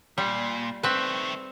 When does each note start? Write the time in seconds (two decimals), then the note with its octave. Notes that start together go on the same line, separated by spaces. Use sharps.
0.18 A#2 G3
0.83 D#3 A3 C4 B4